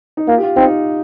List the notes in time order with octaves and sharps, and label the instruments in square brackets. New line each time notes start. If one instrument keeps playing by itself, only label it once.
[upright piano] D#4
[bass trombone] A#3 [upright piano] F4
[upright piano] G4
F4
[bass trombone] C4 [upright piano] D#4